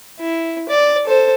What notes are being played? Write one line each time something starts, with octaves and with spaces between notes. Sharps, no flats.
E4
D5
A4 C5